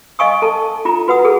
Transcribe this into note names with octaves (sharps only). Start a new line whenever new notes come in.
D#5 F5 G#5 C#6 D#6
A4 A5
E4 F4 A#5
F#4 B4 F#5 D#6
G#4 A4